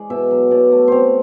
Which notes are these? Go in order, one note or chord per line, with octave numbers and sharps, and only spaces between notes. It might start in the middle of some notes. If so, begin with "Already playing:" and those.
Already playing: G#3 D5
B2 E5
F#3
B2 D5
A3
C4 C5 C#5